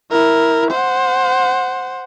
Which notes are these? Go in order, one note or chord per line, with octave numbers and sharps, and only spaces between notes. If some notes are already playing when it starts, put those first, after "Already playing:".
E4 A#4
C5 F#5